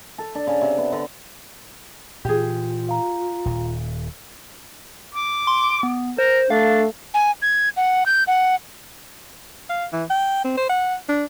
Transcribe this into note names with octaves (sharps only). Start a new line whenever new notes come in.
A4
D4
C#3
C3
B3
D3
A#2 E3 F4 G4 G#4
F5 A#5
D#1 A#2
D6
C6
B3
A#4 C5
A3 D4 F5
G#5
G#6
F#5
G6
F#5
F5
E3
G5
C4
C5
F#5
D4